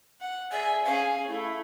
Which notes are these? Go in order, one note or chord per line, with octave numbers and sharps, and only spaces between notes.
F#5
G#4 D5 E5 G#5
C#4 G#4 F5
A3 E4